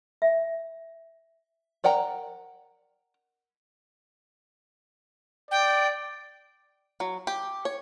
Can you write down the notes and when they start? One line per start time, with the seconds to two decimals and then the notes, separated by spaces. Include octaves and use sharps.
0.22 E5
1.84 A#4 D5 F#5 G5 A#5
5.51 D5 G5
7.00 F#3
7.27 G4
7.65 C#5